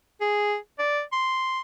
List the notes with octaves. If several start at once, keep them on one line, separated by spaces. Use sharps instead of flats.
G#4
D5
C6